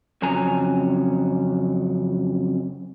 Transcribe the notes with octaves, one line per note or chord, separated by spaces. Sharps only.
F2 C#3 F#3 C#4 G#5 A#5